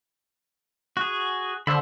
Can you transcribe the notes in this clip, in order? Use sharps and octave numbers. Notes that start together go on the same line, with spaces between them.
F#4 G#4
D3 C5 E5 B5